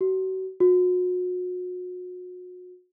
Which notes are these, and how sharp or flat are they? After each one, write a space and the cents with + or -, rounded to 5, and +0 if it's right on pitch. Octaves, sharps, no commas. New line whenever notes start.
F#4 +35
F#4 -35